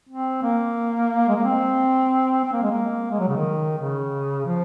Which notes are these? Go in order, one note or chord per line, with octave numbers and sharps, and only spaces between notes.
C4
A#3
G#3
A#3
C4
C4
A#3
G#3
A#3
G#3
F#3
C#3
D#3
C#3
F3